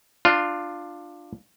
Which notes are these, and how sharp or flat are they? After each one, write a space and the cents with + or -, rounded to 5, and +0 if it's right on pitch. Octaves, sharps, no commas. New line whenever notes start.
D4 +15 F4 +0